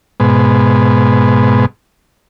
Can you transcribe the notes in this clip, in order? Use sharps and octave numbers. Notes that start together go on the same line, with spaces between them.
G#2 B2